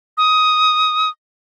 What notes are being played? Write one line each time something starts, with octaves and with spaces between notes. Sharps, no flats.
D#6